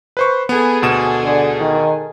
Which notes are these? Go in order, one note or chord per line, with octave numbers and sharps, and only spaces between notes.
B4 C5 C#6
B3 G#4 A4
D2 B2 E7
D3
D#3